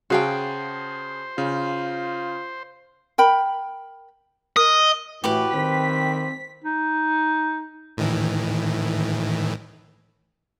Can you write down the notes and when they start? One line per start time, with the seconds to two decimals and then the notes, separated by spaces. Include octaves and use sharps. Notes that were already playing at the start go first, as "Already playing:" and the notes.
0.10 C#3 F#4 G#4 C5 F5 G5 A5
1.38 C#3 F4
3.18 A#4 G5 B5
4.57 A#4 D#5
5.24 A2 E3 F#4 G4 B4 D6
5.54 D#3 C4 B6
6.64 D#4
7.97 A2 D#3 E3